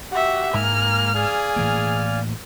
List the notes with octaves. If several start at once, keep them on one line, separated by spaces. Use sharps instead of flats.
F#4 G4 E5 F#5
G#2 G#3 A#3 G#5 A#5 F6
G#4 D5 F5 G#5
A2 E3 A#3 F6